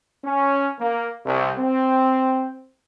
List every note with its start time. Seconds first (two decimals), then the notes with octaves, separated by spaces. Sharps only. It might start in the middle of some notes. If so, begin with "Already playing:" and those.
0.24 C#4
0.80 A#3
1.25 C2
1.59 C4